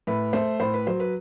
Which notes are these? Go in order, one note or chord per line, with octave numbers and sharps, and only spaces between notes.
A2 B4
A3 C5
A2 C5
B4
F#3 C5
B4